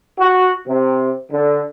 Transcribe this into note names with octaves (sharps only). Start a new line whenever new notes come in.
F#4
C3
D3